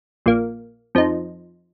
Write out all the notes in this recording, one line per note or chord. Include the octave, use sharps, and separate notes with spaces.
A#1 A#2 A#3
F2 F3 D#4